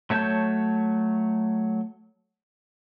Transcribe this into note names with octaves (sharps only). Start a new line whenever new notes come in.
F#3 A3 C#5 A5 G6